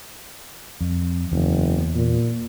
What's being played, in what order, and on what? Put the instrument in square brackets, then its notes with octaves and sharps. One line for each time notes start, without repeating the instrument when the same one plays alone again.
[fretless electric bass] F2
[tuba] F#1 [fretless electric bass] E2
[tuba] A#2